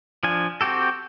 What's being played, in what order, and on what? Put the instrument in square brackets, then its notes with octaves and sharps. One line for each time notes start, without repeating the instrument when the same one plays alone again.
[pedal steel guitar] F3 D4 G#5
C4 F#4 G4 A4